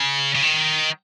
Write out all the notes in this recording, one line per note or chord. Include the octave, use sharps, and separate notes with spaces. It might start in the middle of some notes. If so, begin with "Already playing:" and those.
Already playing: C#3
C#3
D#3